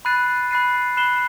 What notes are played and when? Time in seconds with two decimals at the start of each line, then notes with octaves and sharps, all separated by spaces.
0.05 B5 F#6 A6 C7 D#7
0.51 B5 F#6 A6 C7 D#7
0.97 B5 F#6 C7 E7 G7